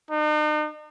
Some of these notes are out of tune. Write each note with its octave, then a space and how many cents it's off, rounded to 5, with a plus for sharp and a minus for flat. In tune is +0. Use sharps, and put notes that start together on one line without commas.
D#4 -45